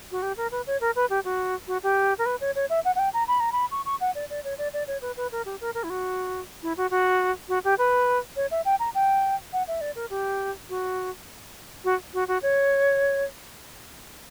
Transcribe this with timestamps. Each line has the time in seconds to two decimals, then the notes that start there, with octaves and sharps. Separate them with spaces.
0.12 F#4
0.22 G4
0.37 A#4
0.51 B4
0.67 C#5
0.81 A#4
0.96 B4
1.10 G4
1.25 F#4
1.68 F#4
1.83 G4
2.18 A#4
2.26 B4
2.41 C#5
2.55 C#5
2.70 E5
2.85 F#5
2.95 F#5
2.99 G5
3.13 A#5
3.28 B5
3.40 A#5
3.52 B5
3.71 C#6
3.86 C#6
4.01 F#5
4.15 D5
4.30 D5
4.44 C#5
4.58 D5
4.73 D5
4.87 C#5
5.02 B4
5.17 B4
5.32 A#4
5.46 G4
5.61 A#4
5.75 A#4
5.84 E4
5.90 F#4
6.63 E4
6.77 F#4
6.91 F#4
7.49 F#4
7.64 G4
7.78 B4
8.36 C#5
8.51 E5
8.65 G5
8.80 A#5
8.95 G5
9.53 F#5
9.68 E5
9.81 D5
9.96 A#4
10.10 G4
10.69 F#4
11.84 F#4
12.14 F#4
12.28 F#4
12.42 C#5